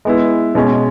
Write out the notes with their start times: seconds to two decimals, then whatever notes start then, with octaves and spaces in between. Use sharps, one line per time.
0.05 G#3 B3 E4
0.55 B2 G#3 C#4